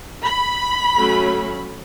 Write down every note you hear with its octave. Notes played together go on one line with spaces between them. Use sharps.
B5
F#3 A3 C#4